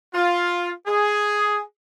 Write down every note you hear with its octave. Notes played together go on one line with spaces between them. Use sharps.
F4
G#4